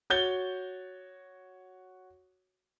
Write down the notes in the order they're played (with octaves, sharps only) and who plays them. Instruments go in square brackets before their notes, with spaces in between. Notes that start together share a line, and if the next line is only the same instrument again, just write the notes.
[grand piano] F#4 C#5 G6 A6 G7